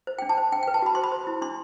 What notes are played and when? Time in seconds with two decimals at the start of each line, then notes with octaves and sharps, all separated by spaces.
0.07 C5
0.19 D4 G5
0.29 A5
0.38 C5
0.52 D4 G5
0.63 B4 G5
0.74 A5
0.82 F#4 B5
0.95 C5 C6
1.04 B5
1.12 C5
1.27 E4
1.42 D4 C6